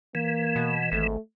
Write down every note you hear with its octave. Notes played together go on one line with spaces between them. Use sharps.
E3 A#3
B2
G#1 A3